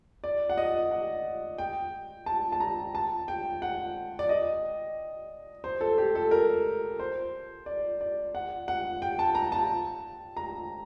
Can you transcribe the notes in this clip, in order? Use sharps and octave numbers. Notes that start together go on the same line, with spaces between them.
D5
F#5
D#5
F#5
G5
A5
A5
A#5
A5
G5
F#5
D5
D#5
C5
A4
G4
A4
A#4
C5
D5
D5
F#5
F#5
G5
A5
A#5
A5
A#5